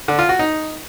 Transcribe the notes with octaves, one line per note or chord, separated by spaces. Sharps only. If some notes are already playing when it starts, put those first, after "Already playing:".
D3
F4
F#4
D#4